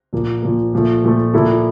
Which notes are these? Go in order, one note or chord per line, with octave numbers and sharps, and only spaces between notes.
A#2 F3 A#3
A#2 F3 A#3
A#2 F3 A3
A#2 F3 A3
A#2 F3 A#3 E4 A4